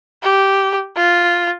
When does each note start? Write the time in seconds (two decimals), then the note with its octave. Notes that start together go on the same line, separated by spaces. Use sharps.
0.22 G4
0.96 F4